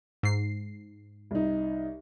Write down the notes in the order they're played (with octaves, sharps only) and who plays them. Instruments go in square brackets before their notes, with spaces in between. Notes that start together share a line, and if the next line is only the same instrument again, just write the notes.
[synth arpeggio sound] G#2 C7
[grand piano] C2 D#4